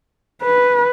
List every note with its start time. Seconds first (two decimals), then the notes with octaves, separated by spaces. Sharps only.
0.43 B4